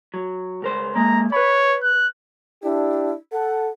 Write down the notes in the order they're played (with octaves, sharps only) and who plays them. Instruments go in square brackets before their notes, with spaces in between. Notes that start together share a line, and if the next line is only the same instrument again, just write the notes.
[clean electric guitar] F#3
C#2 A#4 C5
[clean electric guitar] G#3 A#3 [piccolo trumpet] A#5
[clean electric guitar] B4 B5 [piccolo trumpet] C#5
[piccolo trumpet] F#6
[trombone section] D4 G4 [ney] E4
[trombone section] A4 [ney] F#5